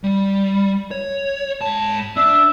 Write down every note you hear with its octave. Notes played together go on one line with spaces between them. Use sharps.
G3
C#5
G#2 A5
D4 E5